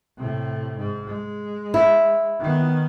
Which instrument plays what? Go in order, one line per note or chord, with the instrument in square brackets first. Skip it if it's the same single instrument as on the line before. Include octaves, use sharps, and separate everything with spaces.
[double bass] A2 C3
G#2
G#3
[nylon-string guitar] E4
[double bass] D#3 B3